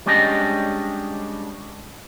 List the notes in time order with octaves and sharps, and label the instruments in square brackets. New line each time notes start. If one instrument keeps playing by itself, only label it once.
[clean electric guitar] G3 G#3 C#4 D4 G4 D#5